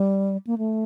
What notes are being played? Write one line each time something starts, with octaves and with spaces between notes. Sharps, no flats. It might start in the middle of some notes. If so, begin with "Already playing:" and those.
Already playing: G3
A#3
A3